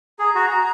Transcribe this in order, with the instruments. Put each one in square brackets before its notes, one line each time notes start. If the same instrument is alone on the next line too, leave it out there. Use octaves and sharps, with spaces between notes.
[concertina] G#4 [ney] A#5
[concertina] F#4